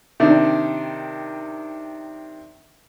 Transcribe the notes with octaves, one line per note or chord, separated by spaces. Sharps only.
C3 D#3 D4